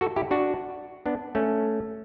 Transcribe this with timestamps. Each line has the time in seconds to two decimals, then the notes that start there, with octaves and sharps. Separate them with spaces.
0.01 F#4 A4
0.16 E4 G4
0.31 D4 F#4
1.06 B3 D4
1.35 A3 C#4